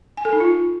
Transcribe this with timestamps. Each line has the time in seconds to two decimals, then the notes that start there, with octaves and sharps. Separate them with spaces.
0.17 G#5
0.25 A4
0.33 D#4
0.40 F4